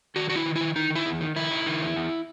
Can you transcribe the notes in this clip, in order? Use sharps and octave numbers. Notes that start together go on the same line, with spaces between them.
D#3 F#4
D#3 F#4
E4
D#3
D#3 E4
D#3 D#4
D#3
E4
E2
D#3
D#3 E4
D#3
D#3
E2
E2